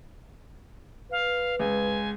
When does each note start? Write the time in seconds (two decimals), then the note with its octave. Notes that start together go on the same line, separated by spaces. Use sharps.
1.11 B4 F5
1.59 C#2 G#5